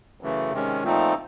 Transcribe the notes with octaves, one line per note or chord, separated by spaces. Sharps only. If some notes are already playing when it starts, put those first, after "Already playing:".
F#2 C#3 E3 A3
C3 D#3 G#3 C#4
A#2 F3 A3 C4 D#4